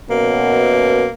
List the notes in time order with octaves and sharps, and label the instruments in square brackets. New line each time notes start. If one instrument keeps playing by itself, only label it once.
[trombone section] F#2 B2 [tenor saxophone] A#3